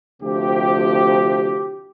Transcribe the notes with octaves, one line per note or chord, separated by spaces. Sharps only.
D2 C3 F3 G4